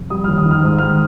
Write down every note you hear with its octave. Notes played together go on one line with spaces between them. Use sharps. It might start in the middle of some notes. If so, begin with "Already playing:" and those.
Already playing: F1
G3 D#6
D#2 F6
D#6
D#3
F6
G#2 D#6
D#3 F6